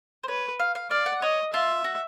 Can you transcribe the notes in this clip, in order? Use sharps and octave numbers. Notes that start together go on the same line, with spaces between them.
C5
B4 C#5
F5
F5
D5 F5
F#5
C#5 D#5
F4 E5
F#4